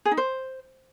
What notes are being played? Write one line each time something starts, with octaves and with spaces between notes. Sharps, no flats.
G#4
D#4
C5